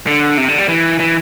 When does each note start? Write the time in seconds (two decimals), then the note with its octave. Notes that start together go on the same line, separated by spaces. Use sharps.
0.07 D3
0.38 C3
0.48 D3
0.58 G3
0.68 E3
1.00 E3